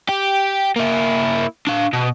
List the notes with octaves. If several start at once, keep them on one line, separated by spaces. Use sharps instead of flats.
G4
A#3 E4
D4 F5
B2